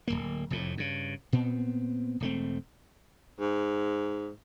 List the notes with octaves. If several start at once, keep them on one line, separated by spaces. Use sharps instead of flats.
D1 G#1 A#3
F1 F2 A2
G2 C#3
A#2 B3 C4
E1 A3 C4
G#2